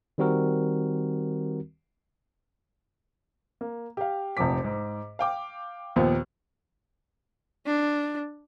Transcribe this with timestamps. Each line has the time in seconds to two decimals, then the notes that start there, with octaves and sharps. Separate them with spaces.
0.18 D#3 G3 C4 F#4 A#4
3.61 A#3
3.97 G4 F5
4.37 F1 A#1 C3 F3 D6 B6
4.64 G#2
5.19 F5 G5 D6
5.96 D#2 A#2 F3 B3
7.66 D4